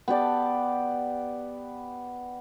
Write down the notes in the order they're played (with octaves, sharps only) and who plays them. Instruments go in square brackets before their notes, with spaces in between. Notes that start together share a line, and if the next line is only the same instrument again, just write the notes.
[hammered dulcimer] B3 G4 D5 A5